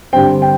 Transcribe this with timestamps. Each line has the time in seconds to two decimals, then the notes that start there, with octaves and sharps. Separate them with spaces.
0.13 G2 D3 G3 C4 G5
0.42 G5